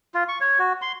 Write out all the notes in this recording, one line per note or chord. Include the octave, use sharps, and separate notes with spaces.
F4
C#6
C#5
F#4
C6